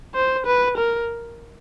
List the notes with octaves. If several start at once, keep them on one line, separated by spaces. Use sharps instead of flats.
C5
B4
A#4